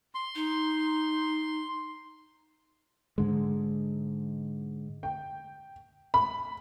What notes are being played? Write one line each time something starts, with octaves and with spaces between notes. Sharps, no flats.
C6
D#4
G#2 D3 G#3
G5
B5